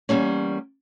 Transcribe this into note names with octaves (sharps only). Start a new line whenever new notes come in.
E2 F#3 G3 A#3 C#4